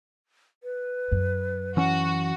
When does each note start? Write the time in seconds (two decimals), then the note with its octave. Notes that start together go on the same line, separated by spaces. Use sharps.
0.63 B4
1.12 F#2
1.77 E3 C#4 F#4